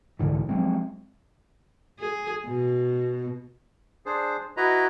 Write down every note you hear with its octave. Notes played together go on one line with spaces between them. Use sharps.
C2 G#2 D3 E3
F3 F#3 G#3 C4
G#4
B2
D4 G#4 C5
E4 F#4 B4 D#5 A#5